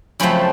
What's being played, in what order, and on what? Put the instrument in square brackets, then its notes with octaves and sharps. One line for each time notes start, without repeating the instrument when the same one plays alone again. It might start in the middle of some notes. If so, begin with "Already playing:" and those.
[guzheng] F#2 C#3 F3 A3 C4 B5